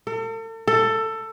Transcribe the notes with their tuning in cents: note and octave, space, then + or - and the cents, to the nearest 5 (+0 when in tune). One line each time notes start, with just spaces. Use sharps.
A4 +40
A4 +15